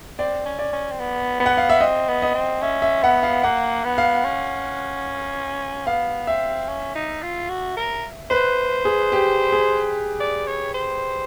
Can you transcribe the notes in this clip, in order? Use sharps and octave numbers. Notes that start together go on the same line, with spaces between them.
C4 D5
C#4
D5
C#4
C4
B3
B3
F#5
F5
E5
C4 D#5
B3
D#5
C4
C#4 E5
E5
B3 F#5
F5
A#3 F#5
B3
F5
C#4
B3 F5
C4 E5
C#4
D#4
F4
F#4
A#4
B4 C5
G#4
G4
G#4
D5
C#5
C5